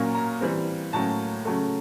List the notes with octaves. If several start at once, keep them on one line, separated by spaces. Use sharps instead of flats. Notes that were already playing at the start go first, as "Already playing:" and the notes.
Already playing: A#2 F#3 A#3 C#4
A#5
E3 G3 C4
A2 F#3 A#3 C#4 A5
C#3 F#3 A3